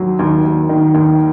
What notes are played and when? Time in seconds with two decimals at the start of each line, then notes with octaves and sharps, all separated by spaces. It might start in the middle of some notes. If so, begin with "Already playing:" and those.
Already playing: D#2 F#3
0.19 D#2
0.45 D#2
0.69 D#3
0.94 D#2